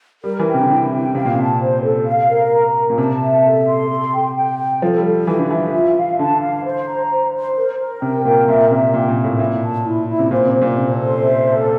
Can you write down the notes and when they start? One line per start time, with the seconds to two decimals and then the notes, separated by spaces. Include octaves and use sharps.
0.24 G3 A#4
0.39 E3
0.47 G5
0.54 C3
0.62 D3
0.70 C3 E4
0.93 G5
1.15 C3 F5
1.25 A#2
1.35 C3 A5
1.61 C5
1.84 A4
2.06 F5
2.30 A#4
2.53 A#5
2.76 A#4
2.90 A#2
2.98 C3 A5
3.22 E5
3.44 A4
3.67 C6
3.90 A4
4.14 G5
4.36 G5
4.59 G5
4.82 F3 A4
4.97 G3
5.05 A4
5.27 E3 A4
5.38 D3
5.51 E3 E5
5.73 F4
5.96 F5
6.19 D3 A5
6.41 F5
6.65 C5
6.88 A#5
7.10 C5
7.34 C5
7.57 A#4
7.79 A#4
8.02 C3 G5
8.25 A#2 A#4
8.48 A#2 E5
8.71 C3 E5
8.94 A#2 G5
9.09 A#2
9.17 E5
9.24 A2
9.39 A#2 E4
9.63 A5
9.85 E4
10.09 E4
10.19 C3
10.31 A#2 C5
10.46 C3
10.54 C5
10.62 A#2
10.76 C3 A4
11.00 C5
11.23 E5
11.46 A4